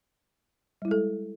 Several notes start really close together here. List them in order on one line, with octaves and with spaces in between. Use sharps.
G3 E4 G#3 A4